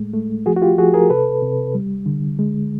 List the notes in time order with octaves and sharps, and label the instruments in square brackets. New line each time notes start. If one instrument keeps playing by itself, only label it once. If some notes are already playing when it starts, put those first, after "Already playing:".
Already playing: [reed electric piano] A2 G#3 A3
A3
F3 F#4 G#4
F#4
F4 G4
F3 F#4 G#4
G#4 A#4
C3 A4 B4
C3
G3
D3
G#3